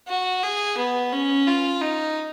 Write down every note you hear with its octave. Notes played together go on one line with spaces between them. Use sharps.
F#4
G#4
B3
C#4
F4
D#4